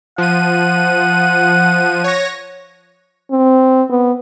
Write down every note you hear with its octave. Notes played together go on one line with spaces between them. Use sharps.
F3 F#5 D#7
C#5 A#6
C4
B3